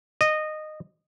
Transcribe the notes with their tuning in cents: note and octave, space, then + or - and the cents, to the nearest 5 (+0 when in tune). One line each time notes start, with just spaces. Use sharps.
D#5 -15